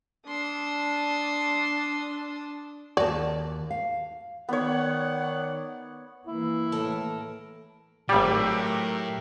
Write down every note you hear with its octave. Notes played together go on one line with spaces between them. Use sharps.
D4 C6 D#6 E6
D#2 F#4 D5 A5
F5
D#3 B3 C#5 D5 F#5
E3 A#3 E4
A2 A4 A#4 A5
G#1 A2 F#3 G3 A3 G4 A#4 E5